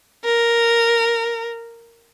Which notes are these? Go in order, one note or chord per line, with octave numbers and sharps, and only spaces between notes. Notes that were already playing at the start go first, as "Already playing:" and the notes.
A#4